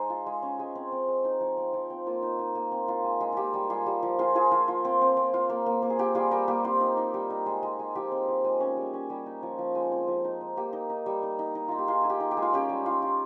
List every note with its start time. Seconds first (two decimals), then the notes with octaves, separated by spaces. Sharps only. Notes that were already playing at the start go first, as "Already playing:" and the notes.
Already playing: G#3 D#4 C5
0.10 F4
0.26 G#3
0.42 C#4
0.59 G#3
0.75 C4
0.92 C4
1.08 G#3
1.25 D#4
1.40 F3
1.57 C4
1.73 F3
1.90 C4
2.06 A#3 F4
2.22 D#4
2.39 D#4
2.55 A#3
2.72 C4
2.88 F4
3.04 G#3
3.21 G#3
3.32 A#3 F4 G4
3.54 G3
3.70 G3 F4 G#4
3.86 G3
4.03 F3
4.19 F3 F4 G#4
4.35 F3 F4 G#4
4.51 F3 F4
4.68 F4
4.85 C4
5.01 C4
5.17 C4
5.34 F4
5.49 A#3
5.66 A#3
5.82 A#3
5.90 G#4
5.99 A#3 G4
6.15 G3 F4 G#4
6.31 G3 G4 A#4
6.48 A#3 G4
6.64 C4 F4
6.81 D#4
6.97 D#4
7.14 G3
7.30 D#4
7.46 G#3
7.63 G#3
7.79 G#3
7.95 F3 G4
8.12 C4
8.28 F3
8.44 G#3
8.60 C#4
8.77 G3
8.93 C#4
9.10 G3
9.26 D#4
9.43 F3
9.59 F3
9.75 G#3
9.91 C4
10.08 F3
10.24 D#4
10.41 D#4
10.57 A#3 G4
10.73 D#4
10.90 D#4
11.06 G3
11.23 D#4
11.39 D#4
11.55 D#4
11.68 D#4 F4
11.78 G4
11.88 D#4 F4 G#4
12.02 D#4 G#4
12.10 G4
12.20 D#4
12.31 G4
12.37 G#3
12.42 F4
12.53 C#4 G4
12.69 G3
12.86 F4
13.02 F4